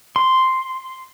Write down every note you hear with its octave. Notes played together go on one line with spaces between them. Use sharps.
C6